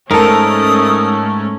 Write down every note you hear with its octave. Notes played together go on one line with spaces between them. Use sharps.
G#2 A3 C#4 A4 A#4 D#6